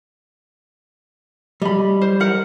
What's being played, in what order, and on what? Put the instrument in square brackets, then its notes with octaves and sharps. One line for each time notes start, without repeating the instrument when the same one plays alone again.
[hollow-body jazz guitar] G3 [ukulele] D#5 B5
[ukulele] C5
A#4 F#5